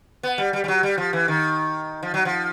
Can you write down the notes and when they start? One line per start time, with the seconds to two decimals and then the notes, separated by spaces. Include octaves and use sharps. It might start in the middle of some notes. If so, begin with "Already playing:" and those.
0.23 B3
0.38 G3
0.53 G3
0.64 G3
0.68 F#3
0.83 G3
0.98 F3
1.13 E3
1.28 D#3
2.03 F3
2.14 F#3
2.25 F3